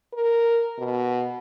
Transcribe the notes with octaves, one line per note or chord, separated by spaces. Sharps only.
A#4
B2